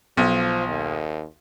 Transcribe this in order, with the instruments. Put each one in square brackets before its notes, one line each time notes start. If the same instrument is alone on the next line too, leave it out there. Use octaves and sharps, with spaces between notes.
[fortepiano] B1 [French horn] F3
[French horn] D#2